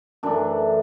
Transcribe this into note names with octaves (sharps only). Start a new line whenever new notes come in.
F#2 E3 A3 D4